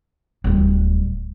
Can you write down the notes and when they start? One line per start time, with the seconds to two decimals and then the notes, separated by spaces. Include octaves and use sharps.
0.44 D1 G3